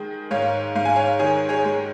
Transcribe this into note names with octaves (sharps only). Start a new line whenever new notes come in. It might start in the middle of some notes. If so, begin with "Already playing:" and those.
Already playing: D#3 G#3
G#2 C#5 F5
G#2 F5
G#5
C#5 F5
D#3 G#4 C#5
G#4 C#5
G#3